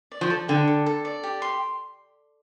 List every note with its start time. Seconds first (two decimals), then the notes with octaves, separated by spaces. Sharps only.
0.12 D5
0.21 F3
0.30 A4
0.48 D3 G5
0.68 A4
0.86 A4
1.05 D5
1.23 G4
1.42 C6